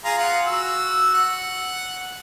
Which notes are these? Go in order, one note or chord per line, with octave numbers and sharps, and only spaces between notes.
F4 G#4 A#5
F4 F#5
F#4 E6
F#5